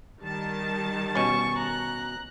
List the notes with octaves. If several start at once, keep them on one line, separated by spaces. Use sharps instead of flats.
D#3 G3 A5
B2 C#4 C#6
A#5 F#6